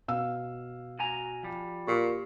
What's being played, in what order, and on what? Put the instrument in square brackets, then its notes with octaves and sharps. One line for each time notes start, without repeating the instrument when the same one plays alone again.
[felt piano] B2 F5 E6
[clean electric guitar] F#4 G#5 A#5
F3 G3
[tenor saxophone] A#2 [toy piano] G4